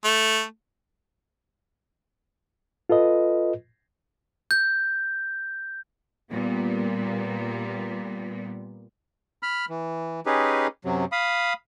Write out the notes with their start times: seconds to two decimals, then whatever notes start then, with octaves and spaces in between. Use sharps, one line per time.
0.05 A3
2.89 F4 A4 B4 D#5
4.51 G6
6.30 A#2 G3 B3
9.43 B5 F6
9.69 E3
10.26 C#4 D#4 G4 G#4 B4
10.85 F#2 C3 F#3
11.12 F5 B5 D#6